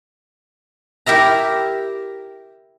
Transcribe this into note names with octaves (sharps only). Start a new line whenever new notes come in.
E4 G4 A#4 E5 A#5